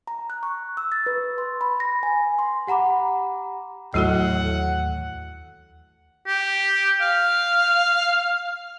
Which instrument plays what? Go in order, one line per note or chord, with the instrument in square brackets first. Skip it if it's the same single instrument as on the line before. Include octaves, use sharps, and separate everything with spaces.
[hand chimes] A#5
F#6
C#6
E6
A6
B4
C6
B5
A#6
G#5
C6
[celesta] G4 F#5 A#5 B5 D6
[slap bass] D#2 E3 [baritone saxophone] A2 [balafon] F#3 F#4 A4 [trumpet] F#5
[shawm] G4
F5